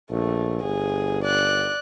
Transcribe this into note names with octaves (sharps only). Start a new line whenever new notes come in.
A#1 A3
G1 G#4
D5 F#6